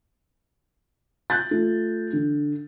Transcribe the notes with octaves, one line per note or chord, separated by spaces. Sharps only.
F#6 G6 A6
A3 F4
D3